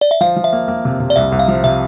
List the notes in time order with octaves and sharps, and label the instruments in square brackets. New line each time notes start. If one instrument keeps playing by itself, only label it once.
[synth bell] D5
E5
[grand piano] F3 [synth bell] F5
[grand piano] F3
[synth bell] E5
[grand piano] A#3
A#3
C3
C3
[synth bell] D5
[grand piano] C2 [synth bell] E5
[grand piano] C2
[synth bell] F5
[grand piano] F3
[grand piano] C3 [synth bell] E5